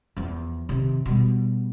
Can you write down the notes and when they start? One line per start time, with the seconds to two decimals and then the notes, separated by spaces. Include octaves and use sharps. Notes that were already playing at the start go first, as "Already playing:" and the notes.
0.17 E2 F3
0.69 C3 D#3
1.06 B2 G3